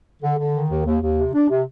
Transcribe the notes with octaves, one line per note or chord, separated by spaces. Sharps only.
D3
D3
D#3
D#2
D#2
D#2
C3
D4
C3